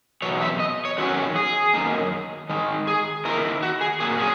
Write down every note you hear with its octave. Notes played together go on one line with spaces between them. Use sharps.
E2 B2 F#3 C#5
E5
D#5
C#5
E2 D#3 F#3 C#4 F#4
G#4
F#2 D#3 A#3 D#4
D#3 G#3 D#4
G#4
D#3 A#3 E4 A#4
F#4
G#4
A#2 F#3 A#3 G#4
G#4